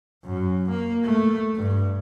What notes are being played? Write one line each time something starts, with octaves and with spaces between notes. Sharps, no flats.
F#2
A#3
A3
G2